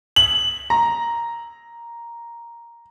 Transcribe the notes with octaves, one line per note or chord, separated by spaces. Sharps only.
F#7
A#5